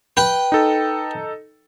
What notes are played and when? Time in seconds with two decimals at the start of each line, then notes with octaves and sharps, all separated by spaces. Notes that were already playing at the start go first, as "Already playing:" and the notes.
0.17 B4 G5
0.52 D#4 A4